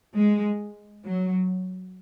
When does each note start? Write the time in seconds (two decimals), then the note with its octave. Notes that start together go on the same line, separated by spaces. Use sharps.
0.16 G#3
1.04 F#3